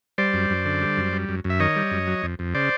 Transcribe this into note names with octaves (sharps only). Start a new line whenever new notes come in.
G3 C5 D5
F#2
F#2
D3
G3
F#2
G3
F#2
F#2
E5
D#3 C#5 D#5
G3
F#2
F#3
F2
F2
C#3 C5 D5